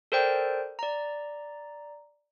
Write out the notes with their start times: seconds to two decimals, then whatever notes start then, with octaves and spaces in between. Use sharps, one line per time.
0.12 A4 A#4 C5 D5 G5
0.79 D5 A#5